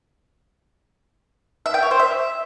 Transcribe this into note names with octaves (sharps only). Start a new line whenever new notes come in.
E5
G5
C#5
C5
E5